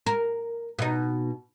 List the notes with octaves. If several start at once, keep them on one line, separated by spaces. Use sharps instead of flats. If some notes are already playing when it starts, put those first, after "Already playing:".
A#4
B2 D#4